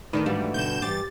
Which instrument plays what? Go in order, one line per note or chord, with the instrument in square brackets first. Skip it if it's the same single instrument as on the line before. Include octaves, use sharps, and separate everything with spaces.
[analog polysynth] D#3 [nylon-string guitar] A3 [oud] D4 D#4 A4 [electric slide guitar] B4
[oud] G#2 E3 F4 [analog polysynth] G3 [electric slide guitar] D4 F#4 B4
[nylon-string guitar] G2 B2 D3 [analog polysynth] G6 E7
[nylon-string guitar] G2 E3 C5 [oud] G4 [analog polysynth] A6